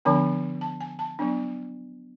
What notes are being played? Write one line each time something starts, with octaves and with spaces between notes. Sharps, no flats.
D3 F3 B3 D4 A5
A5
G#5
A5
F#3 B3 D4